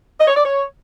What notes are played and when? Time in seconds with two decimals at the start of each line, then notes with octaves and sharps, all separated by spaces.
0.19 D#5
0.27 C#5
0.36 D5
0.44 C#5